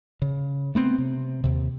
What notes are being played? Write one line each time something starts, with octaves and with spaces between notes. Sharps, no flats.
C#3
A3 B3 C4
C3
D#2 C3